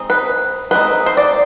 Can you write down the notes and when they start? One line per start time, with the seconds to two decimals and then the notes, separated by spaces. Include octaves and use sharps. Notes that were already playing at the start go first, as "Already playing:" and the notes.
Already playing: G#3 C4 D#4
0.10 B4
0.71 G#3 C4 D#4 B4
1.06 C5
1.17 D5